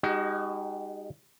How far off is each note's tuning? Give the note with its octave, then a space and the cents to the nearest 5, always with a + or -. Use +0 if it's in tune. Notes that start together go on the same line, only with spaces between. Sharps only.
G#3 -40 D#4 +0 F#4 +40